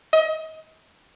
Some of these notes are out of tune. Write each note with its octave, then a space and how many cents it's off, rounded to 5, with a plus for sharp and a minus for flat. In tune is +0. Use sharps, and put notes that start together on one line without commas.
D#5 +30